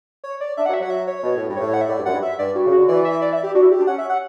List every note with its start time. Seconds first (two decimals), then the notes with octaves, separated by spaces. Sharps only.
0.24 C#5
0.41 D5
0.57 D4 E5
0.66 F#5
0.69 F#3
0.74 E5
0.80 F#3 F#5
0.90 E5
1.07 C#5
1.23 B2
1.36 A2
1.48 G2
1.56 A2 C#5
1.74 F#5
1.81 E5
1.89 A2 D5
1.98 G2
2.06 F#2 F#5
2.13 G2
2.22 E5
2.39 G2 D5
2.55 G2 F#4
2.66 C#3
2.72 F#4
2.78 D3
2.88 E3 D5
3.05 E5
3.22 D5
3.33 E5
3.43 G4
3.55 D4 F#4
3.62 E4
3.71 G4
3.79 D4
3.87 C#4 F#5
3.98 E5
4.09 F#5